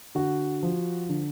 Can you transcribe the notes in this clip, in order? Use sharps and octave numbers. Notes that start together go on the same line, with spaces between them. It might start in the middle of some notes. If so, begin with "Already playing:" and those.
D3 F#4
F3
D3